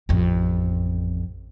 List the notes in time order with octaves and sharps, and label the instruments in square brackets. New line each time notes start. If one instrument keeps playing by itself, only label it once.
[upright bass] A1 F2